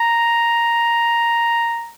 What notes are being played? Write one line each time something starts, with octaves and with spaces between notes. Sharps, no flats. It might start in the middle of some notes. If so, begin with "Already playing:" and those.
Already playing: A#5